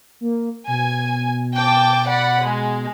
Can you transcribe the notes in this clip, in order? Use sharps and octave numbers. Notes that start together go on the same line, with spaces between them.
A#3
B2 G#5
G5 A5 D6
D5 F#5 B5
G#3